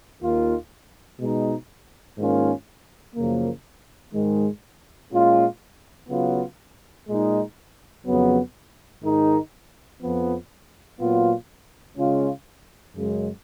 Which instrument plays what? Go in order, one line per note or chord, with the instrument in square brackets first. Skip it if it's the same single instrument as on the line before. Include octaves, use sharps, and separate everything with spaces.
[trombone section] D#2 D#3 A#3 F4
B2 G#3 D#4
G#2 D#3 A#3 C#4 F4
F#2 C#3 F3 A#3
G#2 D#3 G#3
A#2 G#3 C#4 F4
C#3 F#3 B3 F4
A#2 G#3 D#4
F2 C#3 F#3 B3
G#2 D#3 G#3 D#4
F2 F3 B3
A#2 F#3 B3 F4
C#3 G#3 C#4 F4
F#2 C#3 G#3